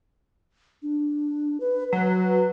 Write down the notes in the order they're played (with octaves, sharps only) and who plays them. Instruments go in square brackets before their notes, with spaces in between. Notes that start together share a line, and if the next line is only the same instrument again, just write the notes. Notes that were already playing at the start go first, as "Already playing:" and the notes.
[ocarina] D4
B4
[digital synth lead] F#3 [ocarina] B4